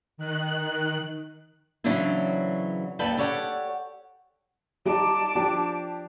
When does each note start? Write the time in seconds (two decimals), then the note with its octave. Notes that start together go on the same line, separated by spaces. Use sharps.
0.18 D#3 F#6
1.84 C#3 E3 F#3 C4 D4 E4
2.99 D#2 G3 A4 B4 G5 A5
3.17 G4 A4 C#5 D5 F5 F#5
4.85 G3 D#4 A5 D6
5.35 F3 D4 G4